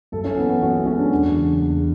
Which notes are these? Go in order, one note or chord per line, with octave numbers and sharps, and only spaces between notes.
F#2 A4
C#4
E3 B3
B3
F#2 F#4
F#4
G#3 C#4
D4
E2
C#3
E2